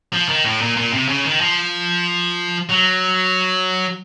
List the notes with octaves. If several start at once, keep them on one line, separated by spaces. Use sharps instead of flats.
F3
D#3
A2
A#2
A#2
C3
C#3
D#3
F3
F#3